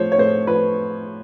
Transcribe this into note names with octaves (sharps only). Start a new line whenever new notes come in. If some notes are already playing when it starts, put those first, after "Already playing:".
Already playing: A2 F3 C5 C#5
C#5
A2 C5
F3 B4